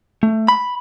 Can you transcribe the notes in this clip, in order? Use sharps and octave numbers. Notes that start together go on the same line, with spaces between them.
A3
B5